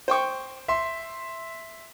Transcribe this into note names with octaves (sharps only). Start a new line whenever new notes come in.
C5 G5 C#6
E5 C6